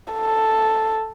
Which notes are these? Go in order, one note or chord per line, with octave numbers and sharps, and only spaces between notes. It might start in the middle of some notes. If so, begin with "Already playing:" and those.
A4